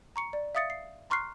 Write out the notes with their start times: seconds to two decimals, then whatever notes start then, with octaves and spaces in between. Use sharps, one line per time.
0.16 A#5 C#6 C#7
0.33 D5
0.55 E5 F5 D#6 A6 C#7
0.70 C7
1.10 A#5 C6 C#6 F6 F#6 C7